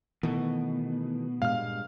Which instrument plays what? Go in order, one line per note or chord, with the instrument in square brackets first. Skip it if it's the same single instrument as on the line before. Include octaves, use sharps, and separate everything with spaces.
[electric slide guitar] B2 [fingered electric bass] D#3 E3 A3
[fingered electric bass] G2 A#2 G#3 [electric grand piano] F5 F6